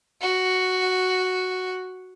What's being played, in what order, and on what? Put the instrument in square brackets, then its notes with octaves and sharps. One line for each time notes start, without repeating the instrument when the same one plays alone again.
[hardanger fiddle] F#4